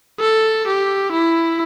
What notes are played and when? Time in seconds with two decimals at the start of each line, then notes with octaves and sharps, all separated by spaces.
0.20 A4
0.67 G4
1.12 E4